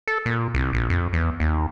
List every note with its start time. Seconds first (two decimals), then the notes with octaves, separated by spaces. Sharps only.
0.07 A4
0.26 A#2
0.54 C2
0.73 A#1
0.90 F2
1.13 E2
1.40 D#2